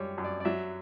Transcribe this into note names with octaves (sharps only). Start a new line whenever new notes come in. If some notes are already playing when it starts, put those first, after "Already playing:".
Already playing: F#2 G3 C#5
F#2
D5
D5
F#3 E5